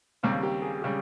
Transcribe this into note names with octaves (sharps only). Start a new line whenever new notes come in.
D#2 C#3 G3 A#3 C4
G4
G#4
G#4
C#3 G3 G4